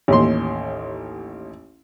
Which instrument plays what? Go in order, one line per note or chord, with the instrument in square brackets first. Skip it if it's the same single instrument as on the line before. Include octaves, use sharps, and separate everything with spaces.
[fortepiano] A1 D#2 C6